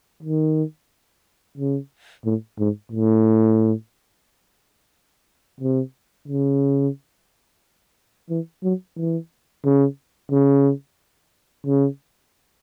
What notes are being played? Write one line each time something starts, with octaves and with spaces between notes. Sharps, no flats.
D#3
C#3
A2
G#2
A2
C3
C#3
E3
F#3
E3
C#3
C#3
C#3